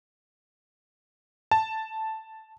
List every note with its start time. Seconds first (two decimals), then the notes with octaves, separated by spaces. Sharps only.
1.51 A5